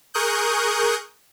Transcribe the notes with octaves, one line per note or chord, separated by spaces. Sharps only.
G#4 A#4 C#6 D#6 F#6 G6